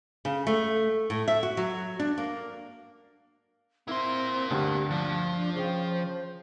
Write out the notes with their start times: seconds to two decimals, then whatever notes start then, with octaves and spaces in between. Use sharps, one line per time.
0.25 C#3
0.47 A3
1.10 A2
1.28 E5
1.43 F#4
1.57 F#3
1.99 D4
2.18 A#3
3.88 A#3 C4 E4 C6
4.50 D2 G2 G4
4.90 F3 D4
5.36 D4
5.55 C#3 C5 F5 G5